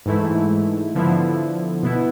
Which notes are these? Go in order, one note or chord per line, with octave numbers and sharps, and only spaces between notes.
G#2 E3 A3 E4
D3 F3 B3 E4
B2 B3 E4